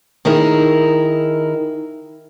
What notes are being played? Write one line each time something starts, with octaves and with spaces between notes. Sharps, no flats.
D#3 D#4 E4 G#4 A#4